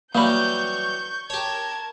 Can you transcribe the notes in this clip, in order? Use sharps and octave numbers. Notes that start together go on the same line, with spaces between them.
E3 F#3 G3 A#3 B5 C#6 G6
G4 A#4 C#5 A5 G#6